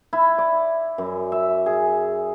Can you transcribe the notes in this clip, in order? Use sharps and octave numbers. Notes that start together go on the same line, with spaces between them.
E4
D5
F#2
E5
G#4